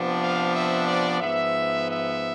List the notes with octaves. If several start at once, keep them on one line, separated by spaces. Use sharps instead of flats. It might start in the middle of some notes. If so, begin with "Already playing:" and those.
Already playing: C3 F3 B3 D4
F5
E5
D5
G#2 F3 B3 E5
E5